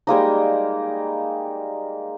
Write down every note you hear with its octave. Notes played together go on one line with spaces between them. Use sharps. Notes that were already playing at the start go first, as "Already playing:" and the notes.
G3 G#3 A#3 D#4